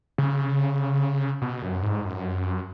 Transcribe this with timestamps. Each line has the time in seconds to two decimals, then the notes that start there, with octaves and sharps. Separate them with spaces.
0.18 C#3
1.42 B2
1.62 F#2
1.83 G#2
2.04 F#2